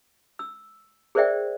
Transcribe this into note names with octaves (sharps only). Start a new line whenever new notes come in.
E6
G#4 A#4 C5 D5 E5 G5